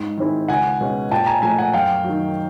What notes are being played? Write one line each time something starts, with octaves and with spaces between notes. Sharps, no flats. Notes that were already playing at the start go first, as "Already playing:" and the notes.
Already playing: G#2
D#3 G#3 C4 E4
C#2 F#5 G#5
B2 G#3 C#4
A#2 G5 A5
G#5 A#5
F3 A3 G#5 A#5
F#5 G#5
F#2 F5 G5
D#3 F#3